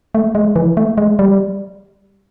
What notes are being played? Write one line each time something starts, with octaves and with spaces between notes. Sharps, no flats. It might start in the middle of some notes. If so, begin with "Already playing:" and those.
A3
G#3
E3
A3
G#3
G3